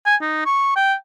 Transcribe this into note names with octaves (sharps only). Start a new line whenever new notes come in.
G#5
D#4
C#6
G5